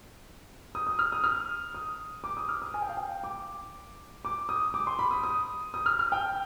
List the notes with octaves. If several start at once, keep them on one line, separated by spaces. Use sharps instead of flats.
D#6
D#6
F6
D#6
F6
D#6
D6
D#6
F6
D#6
G#5
G5
F5
G5
D6
D6
D#6
D6
C6
B5
D#6
D#6
D#6
F6
F6
G5